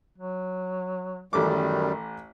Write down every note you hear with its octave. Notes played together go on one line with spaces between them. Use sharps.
F#3
A1 F#2 D#3 G3 A3 D6